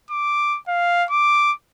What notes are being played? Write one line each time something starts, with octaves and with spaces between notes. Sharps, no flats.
D6
F5
D6